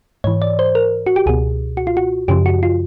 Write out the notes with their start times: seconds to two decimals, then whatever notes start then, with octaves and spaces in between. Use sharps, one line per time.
0.24 G#2 E3 C#5
0.42 D5
0.59 C5
0.75 A#4
1.07 F#4
1.16 G4
1.26 C#2 B2 G#4
1.77 F#4
1.87 F4
1.97 F#4
2.28 F#2 C#3 F3 G4
2.46 F#4
2.63 F4